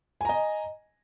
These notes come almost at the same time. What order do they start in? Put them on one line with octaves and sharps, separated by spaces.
G#5 A#5 D#5